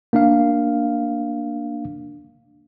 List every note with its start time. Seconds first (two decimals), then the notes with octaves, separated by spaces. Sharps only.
0.13 A#3 D4 F5